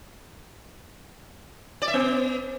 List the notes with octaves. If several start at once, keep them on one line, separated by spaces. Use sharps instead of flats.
D5
E5
B3